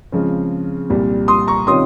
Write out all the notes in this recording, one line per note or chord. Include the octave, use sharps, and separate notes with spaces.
C#3 F3 G#3 C4
C2 A#2 G3
C6 D#6
A#5 C#6
C3 D#3 G3 C#4 F4 C6 D#6